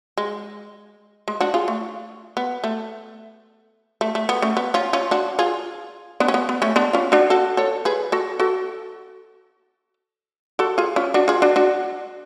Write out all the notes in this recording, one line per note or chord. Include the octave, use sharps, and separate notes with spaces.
G#3
G#3
D4 F#4
F4 G#4
A3
B3
A3
A3
A3
B3
A3 C#4
B3
C#4 F4
C#4 F4
D4 F#4
F4 G#4
B3 D4
C#4
B3
B3
A3 C#4
B3 D4
C#4 F4
D4 F#4
F#4 A4
A4 C#5
G#4 B4
F#4 A4
F#4 A4
F#4 A4
F4 G#4
C#4 F4
D4 F#4
F4 G#4
D4 F#4
D4 F#4